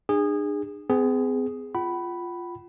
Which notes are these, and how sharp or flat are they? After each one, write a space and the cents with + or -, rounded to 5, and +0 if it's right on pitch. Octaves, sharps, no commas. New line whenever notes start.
D4 +40 G#4 -25
C4 -45 G#4 +0
F4 +0 F#5 +45 B5 +0